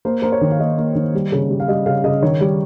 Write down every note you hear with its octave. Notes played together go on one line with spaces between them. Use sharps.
A#3 C5
A#3 C5
C#5
D#3
F5
A#3 D#5
A#3
D#3
G3
C#3
G3
F5
G3 D#5
C#3 F5
C#3 D#5
D#3 C#5
G3